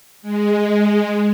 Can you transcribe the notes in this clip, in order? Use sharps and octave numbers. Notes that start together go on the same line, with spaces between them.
G#3